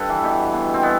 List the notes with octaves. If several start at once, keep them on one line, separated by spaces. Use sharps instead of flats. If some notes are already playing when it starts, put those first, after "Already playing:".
Already playing: G2 A4 B4
E3
B2 G4
B2
C4
B2 B3